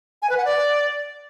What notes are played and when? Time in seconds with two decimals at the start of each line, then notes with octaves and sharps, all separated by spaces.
0.22 G#5
0.30 B4
0.37 F#5
0.45 D5